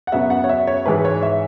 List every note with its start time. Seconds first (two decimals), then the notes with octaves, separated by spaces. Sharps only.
0.07 F#5
0.12 F#2 C#3 F#3 B3 E5
0.30 F#5
0.44 C#5
0.49 E5
0.67 C#5
0.86 G#2 E3 G#3 B4
1.05 C#5
1.22 E5